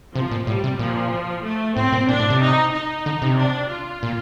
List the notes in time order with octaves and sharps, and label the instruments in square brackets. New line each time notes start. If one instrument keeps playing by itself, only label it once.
[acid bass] C3 [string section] F3
[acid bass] A#2
[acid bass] A2 [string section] G3
[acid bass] C3
[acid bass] A#2 [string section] F3
[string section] A3
[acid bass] A2 [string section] C4
[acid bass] A#2
[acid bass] A#2 [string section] D4
[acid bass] A2
C3
[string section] D#4
D#4
[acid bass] D3
C3
[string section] D4
F4
[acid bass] A#2